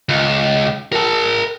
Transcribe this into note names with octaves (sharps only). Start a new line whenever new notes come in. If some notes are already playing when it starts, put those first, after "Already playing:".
C#2
A#4 A5